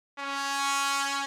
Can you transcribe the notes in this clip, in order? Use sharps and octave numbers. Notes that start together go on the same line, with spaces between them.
C#4